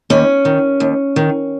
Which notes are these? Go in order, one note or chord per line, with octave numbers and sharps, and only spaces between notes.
D#2 C#4
D#3
D#2
D#3